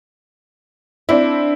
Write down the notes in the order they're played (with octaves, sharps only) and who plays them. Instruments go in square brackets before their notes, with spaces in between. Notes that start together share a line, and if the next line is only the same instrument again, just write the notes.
[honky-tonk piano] C4 E4 [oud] D4